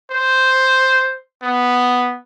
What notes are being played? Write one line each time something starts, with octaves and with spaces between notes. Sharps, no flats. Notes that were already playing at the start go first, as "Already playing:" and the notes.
C5
B3